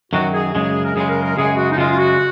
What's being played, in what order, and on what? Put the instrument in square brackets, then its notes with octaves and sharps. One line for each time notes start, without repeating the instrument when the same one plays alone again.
[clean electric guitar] F#2 D#3 F#3 [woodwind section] F#4
[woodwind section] G#4
[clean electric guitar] F#2 C#3 G#3 [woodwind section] G#4
[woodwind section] A#4
[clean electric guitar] F#2 C#3 G#3 [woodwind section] G#4
[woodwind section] A#4
A#4
[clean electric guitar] F#2 C#3 G#3 [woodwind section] G#4
[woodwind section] F#4
D#4
[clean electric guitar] F#2 C#3 G#3 [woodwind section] F4
[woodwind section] F4
F#4